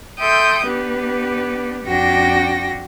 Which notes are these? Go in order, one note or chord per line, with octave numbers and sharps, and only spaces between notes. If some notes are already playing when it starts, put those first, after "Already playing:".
A4 E5 G5 C6 D#6 G6
B3 D4 G4 B4
F2 D4 F#4 G5 A#6